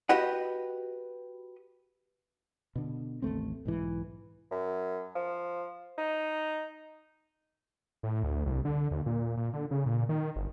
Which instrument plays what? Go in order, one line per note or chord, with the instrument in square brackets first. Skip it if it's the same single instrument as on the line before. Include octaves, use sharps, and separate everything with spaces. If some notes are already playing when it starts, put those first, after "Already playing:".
[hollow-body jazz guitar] F#4 G4 B4 D#5 F#5
[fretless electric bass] B2 D3
A1 D#2 A3 C4
B1 G#2 E3
[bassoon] F#2
F3
D#4
[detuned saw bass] A2
D2
C2
D3
D#2
A#2
A#2
D3
C#3
A#2
D#3
G1